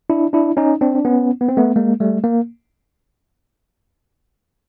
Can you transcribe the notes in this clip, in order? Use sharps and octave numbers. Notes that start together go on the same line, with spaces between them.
D4 E4
D4 E4
C#4 D#4
C4 D4
D4
B3 C#4
B3
C4
A3 B3
G#3 A#3
G3 A3
A#3